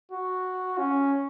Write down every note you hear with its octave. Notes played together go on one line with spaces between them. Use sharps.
F#4
C#4